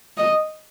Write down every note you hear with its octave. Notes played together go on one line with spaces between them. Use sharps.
D#5